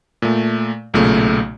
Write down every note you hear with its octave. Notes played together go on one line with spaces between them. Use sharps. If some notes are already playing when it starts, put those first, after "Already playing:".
A#2 A3
B1 A#2 C#3 A3